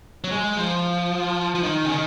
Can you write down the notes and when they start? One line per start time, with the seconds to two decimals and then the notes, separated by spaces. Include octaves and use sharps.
0.24 F#3
0.31 G#3
0.57 F3
1.55 F3
1.63 D#3
1.85 C#3
1.90 D#3